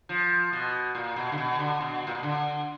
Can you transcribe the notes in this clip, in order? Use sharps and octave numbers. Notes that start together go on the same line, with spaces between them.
F3
B2
A#2
B2
D3
B2
D3
B2
A#2
B2
D3